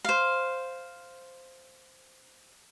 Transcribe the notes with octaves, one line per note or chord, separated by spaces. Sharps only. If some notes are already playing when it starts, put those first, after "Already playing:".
C5 F5